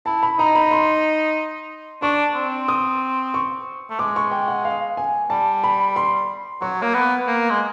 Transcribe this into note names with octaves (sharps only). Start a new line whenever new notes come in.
E4 A5
B5
D#4 A#5
B5
C6
D4 C#6
C4
D#6
C#6
A3
G#3 D6
C#6
G5
F#5
F5
G#5
G3 A5
B5
C6
F#3 C#6
A#3
B3
A#3
G#3